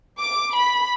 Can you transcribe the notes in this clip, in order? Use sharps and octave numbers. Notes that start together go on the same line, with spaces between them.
D6
B5